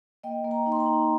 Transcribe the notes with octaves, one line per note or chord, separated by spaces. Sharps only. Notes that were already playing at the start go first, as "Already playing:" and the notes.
A#3 D#5 G5
A#3
G5 A#5
D#4
C6
G5 A#5
D#4